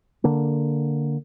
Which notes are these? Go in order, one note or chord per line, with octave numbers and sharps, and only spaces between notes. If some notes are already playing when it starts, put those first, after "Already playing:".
D3 A#3